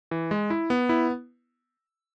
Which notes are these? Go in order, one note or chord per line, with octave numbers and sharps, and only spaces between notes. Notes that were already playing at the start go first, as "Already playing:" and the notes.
E3
G#3
E4
B3
E4